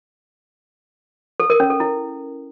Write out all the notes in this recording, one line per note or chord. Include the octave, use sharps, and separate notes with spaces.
A4
A#4
C#4
A4
E4